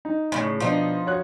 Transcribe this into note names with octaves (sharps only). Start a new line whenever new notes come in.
D#4
A2 C#3
B2 F3 B3 D4 D#4
F#4 C#5 F#6